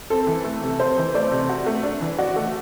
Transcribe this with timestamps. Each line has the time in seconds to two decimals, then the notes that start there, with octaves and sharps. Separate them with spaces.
0.10 C4 A4
0.27 E3
0.44 A3
0.62 C3
0.79 C4 C5
0.98 E3
1.14 A3 D5
1.31 C3
1.49 F#4
1.67 A3
1.83 D4
2.01 E3
2.19 F#4 D5
2.36 A3